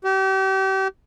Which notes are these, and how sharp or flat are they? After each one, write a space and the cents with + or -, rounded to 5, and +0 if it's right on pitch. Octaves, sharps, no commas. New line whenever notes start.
G4 -35